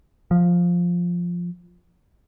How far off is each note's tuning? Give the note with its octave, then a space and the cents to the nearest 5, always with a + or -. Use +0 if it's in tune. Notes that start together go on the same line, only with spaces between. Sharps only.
F3 +5